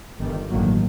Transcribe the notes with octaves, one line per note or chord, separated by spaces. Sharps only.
G1 G2 D#3 G3
A1 G2 D#3 F#3 A#3